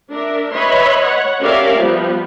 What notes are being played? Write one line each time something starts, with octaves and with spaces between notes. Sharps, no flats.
D4 A#4 E5
B4 C#5 D#5 E5 B5 C6
C#5 F#5
C#4 G4 A#4 D5 E5 F5
F3 G3 B3